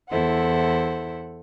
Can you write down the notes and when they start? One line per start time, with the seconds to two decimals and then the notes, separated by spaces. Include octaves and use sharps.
0.10 E2 E4 A4 C5 F#5